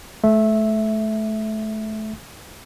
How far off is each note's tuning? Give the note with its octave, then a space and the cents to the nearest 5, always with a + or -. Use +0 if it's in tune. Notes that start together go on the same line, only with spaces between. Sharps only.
A3 -25 E5 +0